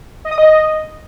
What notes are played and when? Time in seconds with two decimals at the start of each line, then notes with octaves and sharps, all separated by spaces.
0.25 D#5
0.31 D#6
0.38 D#5